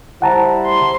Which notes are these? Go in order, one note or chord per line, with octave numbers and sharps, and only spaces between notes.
G3 E4 C5 F#5 A5 A#5
C6